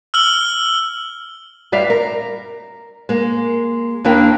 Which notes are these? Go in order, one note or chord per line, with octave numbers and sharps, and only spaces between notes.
E6 F6 F#7 G7
G2 G3 D5 E5 F5
A#4
G#3 A#3
D#2 A#3 D4 E4 A#4 G5